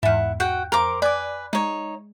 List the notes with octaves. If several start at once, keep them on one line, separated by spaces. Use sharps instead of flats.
E2 G#2 E4 F#5
F#4 F#5 G5
F2 A#4 C5 D6
B4 D5 G#5 D6
G#3 D#4 C#5